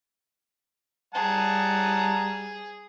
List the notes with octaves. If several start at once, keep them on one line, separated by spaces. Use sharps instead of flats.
G3 G#4 F#5 A5 A#5